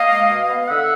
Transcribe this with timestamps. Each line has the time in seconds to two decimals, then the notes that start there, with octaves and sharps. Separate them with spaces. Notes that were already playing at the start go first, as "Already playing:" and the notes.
Already playing: A#3 D#5 F5
0.09 G#3
0.28 B2
0.48 B3
0.68 D3 E5 F#5